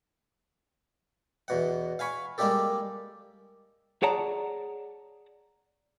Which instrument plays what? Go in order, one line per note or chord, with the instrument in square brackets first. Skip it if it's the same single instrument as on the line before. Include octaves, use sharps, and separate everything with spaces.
[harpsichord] E2 B2 F#5
F5 G#5 B5 C#6
G3 G#3 A#3 D4 G4 A4
[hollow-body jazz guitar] G#4 C#5 D5 F#5 A5 A#5